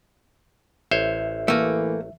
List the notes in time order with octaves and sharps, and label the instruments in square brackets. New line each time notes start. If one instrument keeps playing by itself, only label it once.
[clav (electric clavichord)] A1 C5 C#5 [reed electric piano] E5
[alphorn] E3 [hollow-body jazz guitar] A3 A#3